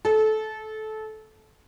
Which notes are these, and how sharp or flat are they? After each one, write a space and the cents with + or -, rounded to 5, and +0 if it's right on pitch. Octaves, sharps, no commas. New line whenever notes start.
A4 -20